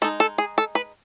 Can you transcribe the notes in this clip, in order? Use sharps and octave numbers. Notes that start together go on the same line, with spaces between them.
G#3 D#4 A4
A4
G#4
A4
B4